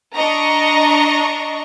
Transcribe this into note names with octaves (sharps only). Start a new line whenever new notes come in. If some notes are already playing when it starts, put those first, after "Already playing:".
D4 D#5 A#5 C#6